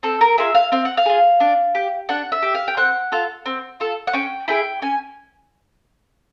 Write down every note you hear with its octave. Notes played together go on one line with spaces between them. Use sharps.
C4 A4
A#4
F4 G#4 E5
F5
C4 F5
F#5
F5
F4 G#4
D4
G4
D4 F#5
E5
G4
F5
G5
C4 F#5
F4 A4
C4
F4 A4
F#5
C#4 G5
E4 G#4 G5
C#4 G#5